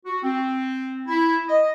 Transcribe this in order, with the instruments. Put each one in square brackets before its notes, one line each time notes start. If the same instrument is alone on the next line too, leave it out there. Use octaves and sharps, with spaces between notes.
[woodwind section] F#4
C4
E4
D#5